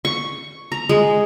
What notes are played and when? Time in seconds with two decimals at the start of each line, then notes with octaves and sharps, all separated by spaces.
0.05 C#6
0.72 A#5
0.89 G#3